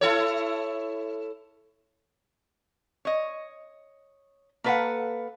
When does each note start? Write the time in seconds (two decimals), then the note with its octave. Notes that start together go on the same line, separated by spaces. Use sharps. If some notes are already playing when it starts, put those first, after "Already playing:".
0.01 E4 A4 C#5
3.05 C#5 D#5
4.64 A#3 A4 B4 C5 F5 F#5